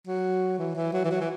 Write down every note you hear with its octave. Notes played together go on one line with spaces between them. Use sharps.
F#3
E3
E3
F#3
E3
F#3
E3